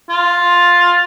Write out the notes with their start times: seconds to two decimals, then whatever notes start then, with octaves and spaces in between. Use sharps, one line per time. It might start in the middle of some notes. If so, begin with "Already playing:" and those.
0.09 F4